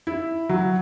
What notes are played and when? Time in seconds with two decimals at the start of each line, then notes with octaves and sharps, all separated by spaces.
0.07 E4
0.49 F#3